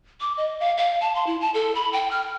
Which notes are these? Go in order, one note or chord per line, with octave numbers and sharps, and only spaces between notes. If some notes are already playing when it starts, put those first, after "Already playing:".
D6
D#5
F5
F5
A5
C6
E4
A5
A4
B5
G5
F6